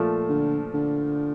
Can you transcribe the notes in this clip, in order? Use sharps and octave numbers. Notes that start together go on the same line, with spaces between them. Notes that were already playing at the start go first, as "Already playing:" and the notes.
Already playing: A#2 F3 A3
D3
D3